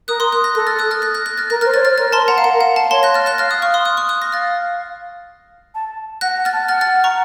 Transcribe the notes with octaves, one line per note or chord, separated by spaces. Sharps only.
A#4 D#6 F#6
C6 D#6
D#6 F#6
F#6 A#6
A4 F#6 A#6
F6 A6
D#6 F#6
F6 A6
F#6 A#6
F#6 A#6
F#6 A#6
F6 A6
A#4 F#6 A#6
F6 A6
C5
C#5 F6 A6
C5
F6 A6
A#4 F6 A6
A5 C6
F#5 A#5
F5
A#4 F#5
F#5
F5 A5
C#5 A5 C6
F#6 A#6
F6 A6
F#6 A#6
F5 F6 A6
D#6 F#6
C#6 F6
C6 D#6
D#6 F#6
C#6 F6
D#6 F#6
F#6 A#6
F5 F6 A6
A5
F#5 F#6 A#6
F#5
F6 A6
A5
F#5 F6 A6
F6 A6
A#5 C#6